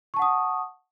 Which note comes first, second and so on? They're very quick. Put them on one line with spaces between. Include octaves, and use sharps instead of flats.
C#6 A5 F#5 D#6